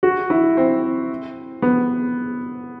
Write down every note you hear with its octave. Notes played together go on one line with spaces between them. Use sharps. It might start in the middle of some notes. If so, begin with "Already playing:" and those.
F#4
E4
C4
B3